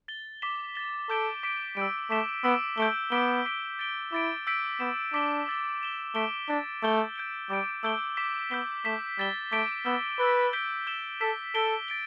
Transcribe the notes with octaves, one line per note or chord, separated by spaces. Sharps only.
A6 G7
D6 B6 E7 G7
A6 G7
A4 D6 G6 D7 G7
D6 B6 D7
G3 E6 G6 D7
A3 D6 B6 E7 G7
B3 E6 B6 D7 G7
A3 G6 D7 G7
B3 D6 B6 D7 G7
D6 B6 D7
A6 D7 G7
E4 D6 A6 D7
E6 G6 B6 D7
B3 D6 G6 B6 E7
D4 D6 B6 D7 G7
E6 A6 G7
A6 E7 G7
A3 E6 B6 D7 G7
D4 A6 G7
A3 E6 G6 E7 G7
G6 D7 G7
G3 D6 A6 D7
A3 E6 G6 D7 G7
D6 B6 E7 G7
B3 E6 G6 B6 E7 G7
A3 D6 B6 E7 G7
G3 E6 A6 E7 G7
A3 D6 G6 B6 D7 G7
B3 E6 G6 E7 G7
B4 E6 A6 D7 G7
G6 B6 D7 G7
E6 G6 E7 G7
A4 E6 B6 E7
A4 G6 B6 D7 G7
A6 D7 G7